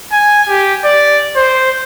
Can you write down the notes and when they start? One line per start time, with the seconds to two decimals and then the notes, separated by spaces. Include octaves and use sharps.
0.12 G#5
0.49 G4
0.85 D5
1.36 C5